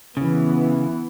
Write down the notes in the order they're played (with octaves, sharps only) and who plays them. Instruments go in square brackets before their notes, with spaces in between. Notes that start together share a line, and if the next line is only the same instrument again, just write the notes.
[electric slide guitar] C#3 [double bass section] E3 B3